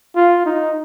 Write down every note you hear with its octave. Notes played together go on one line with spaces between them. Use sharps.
F4
D#4